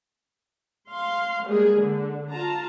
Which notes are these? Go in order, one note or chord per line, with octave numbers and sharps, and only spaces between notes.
F5 C6
G3 G#3 A#3 G#4
D3
F4 A5 A#5